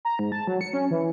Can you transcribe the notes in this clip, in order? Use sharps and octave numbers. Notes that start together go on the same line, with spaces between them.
A#5
G#2
A5
F#3
C#7
C#4
E3